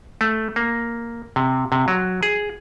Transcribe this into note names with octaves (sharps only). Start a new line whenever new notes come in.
A3
A#3
C3
C3
F#3
G#4